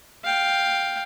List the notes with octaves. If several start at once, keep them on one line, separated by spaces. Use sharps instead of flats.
F5 G5